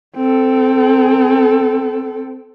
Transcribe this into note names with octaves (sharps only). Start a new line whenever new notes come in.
C4 A4